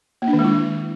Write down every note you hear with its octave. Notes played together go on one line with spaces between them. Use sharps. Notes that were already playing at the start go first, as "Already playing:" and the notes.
A#3
D4
D#3
G#3
E4